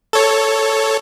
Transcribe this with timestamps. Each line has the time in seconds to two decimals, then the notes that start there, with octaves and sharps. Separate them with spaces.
0.13 A4 C#5